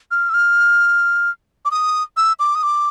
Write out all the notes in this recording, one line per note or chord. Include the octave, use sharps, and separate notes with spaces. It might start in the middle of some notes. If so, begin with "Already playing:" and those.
F6
E6
F6
D6
D#6
E6
D6
D#6
D6